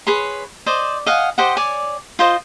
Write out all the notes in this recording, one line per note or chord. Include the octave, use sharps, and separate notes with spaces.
G#4 B4 C#5 C6
C5 D5 D#5
D#5 F5 F#5 G#5
G4 C5 D#5 F#5
C#5 D5 G#5
F4 C5 D#5